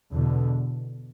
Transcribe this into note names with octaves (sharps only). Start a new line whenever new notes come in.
E2 B2 D3